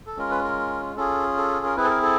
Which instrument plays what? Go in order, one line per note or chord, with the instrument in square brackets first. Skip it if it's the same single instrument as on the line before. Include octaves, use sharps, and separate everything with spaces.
[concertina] A4
G#3 C#4 F4 A#4
B4
A#4
C#4 F4 G#4 A4
A4
A#4
C4 E4 G#4 B4
A4
A#4
A4